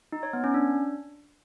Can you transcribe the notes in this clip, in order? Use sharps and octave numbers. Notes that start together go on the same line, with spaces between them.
D#4
C#5
B3
C#4
D4